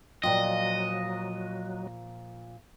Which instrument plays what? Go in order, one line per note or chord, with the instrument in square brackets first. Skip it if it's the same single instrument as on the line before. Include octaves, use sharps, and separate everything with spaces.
[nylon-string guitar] A#2 F3 F4 [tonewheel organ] F#3 [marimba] D5 G5 [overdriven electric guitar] D#5